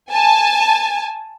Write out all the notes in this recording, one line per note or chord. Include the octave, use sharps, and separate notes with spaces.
G#5 A5